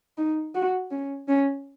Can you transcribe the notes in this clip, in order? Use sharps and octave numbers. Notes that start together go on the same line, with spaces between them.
D#4
F#4
C#4
C#4